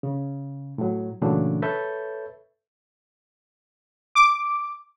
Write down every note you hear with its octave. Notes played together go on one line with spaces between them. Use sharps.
C#3
A2 F#3
A#2 C#3 E3 F#3 A3 D4
A4 B4 C#5 E5 G6 A6
D6